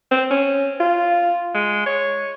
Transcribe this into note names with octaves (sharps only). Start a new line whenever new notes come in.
C4
C#4
F4
G#3
C#5